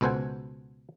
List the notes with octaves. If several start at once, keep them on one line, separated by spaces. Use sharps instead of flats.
C#2 B2 A4 C5 F#5 G#5